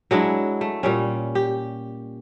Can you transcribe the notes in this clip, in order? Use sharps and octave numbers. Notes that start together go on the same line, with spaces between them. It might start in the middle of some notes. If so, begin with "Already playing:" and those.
F#3 G#3 D4 E4
A3
A#2 G3 C#4
G4